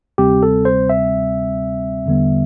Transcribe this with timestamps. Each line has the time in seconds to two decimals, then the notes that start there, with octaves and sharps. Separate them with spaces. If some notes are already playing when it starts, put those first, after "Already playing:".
0.18 D2 C3 G3 C4 G4
0.43 A4
0.65 C5
0.90 E5
2.06 E2 D3 G3 B3